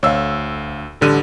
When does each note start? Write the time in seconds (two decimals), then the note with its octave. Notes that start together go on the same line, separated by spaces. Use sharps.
0.03 D2 C#5 F5 E6
1.01 A1 D3 G3 F6 D#7